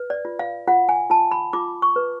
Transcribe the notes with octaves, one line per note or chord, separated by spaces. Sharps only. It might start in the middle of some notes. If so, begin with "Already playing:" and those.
Already playing: B4
D5
F4
F5
F4 F#5
G#5
F4 A5
B5
F4 D6
C#6
B4